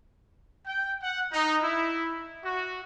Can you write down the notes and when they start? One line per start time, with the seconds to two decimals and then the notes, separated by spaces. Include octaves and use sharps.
0.66 G5
1.02 F#5
1.32 D#4
1.63 E4
2.44 F#4